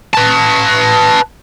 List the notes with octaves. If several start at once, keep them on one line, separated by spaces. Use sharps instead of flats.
B4 A5